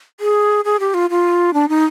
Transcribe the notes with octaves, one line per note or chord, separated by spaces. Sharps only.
G#4
G#4
G4
F4
F4
D4
D#4